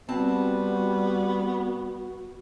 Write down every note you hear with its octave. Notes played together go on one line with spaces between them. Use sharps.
G3 B3 C4 F#4 A5